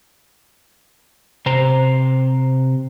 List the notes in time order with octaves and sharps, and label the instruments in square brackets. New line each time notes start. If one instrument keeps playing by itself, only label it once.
[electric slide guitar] C3 C5 A#5